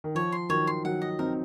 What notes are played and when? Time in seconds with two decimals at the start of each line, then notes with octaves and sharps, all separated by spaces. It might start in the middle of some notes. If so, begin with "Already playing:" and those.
0.04 D#3
0.15 F3 C#5
0.32 C6
0.49 D#3 F#3 C#5
0.67 C6
0.84 D#3 F#3 F#5
1.02 D#5
1.19 C4 D#4 A#4